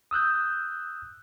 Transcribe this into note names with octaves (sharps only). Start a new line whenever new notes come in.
D#6 E6 F#6 G6